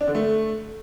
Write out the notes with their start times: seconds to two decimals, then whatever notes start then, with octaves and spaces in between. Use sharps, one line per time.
0.01 D4
0.08 D3
0.15 A3